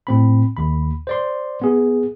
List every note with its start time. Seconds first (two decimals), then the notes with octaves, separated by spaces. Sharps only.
0.07 A2 C4 B5
0.57 D#2 B5
1.07 C5 D5 C6
1.62 B3 G#4